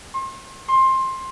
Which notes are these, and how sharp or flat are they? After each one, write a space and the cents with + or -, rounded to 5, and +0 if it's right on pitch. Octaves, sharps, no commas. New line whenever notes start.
C6 +40
C6 +20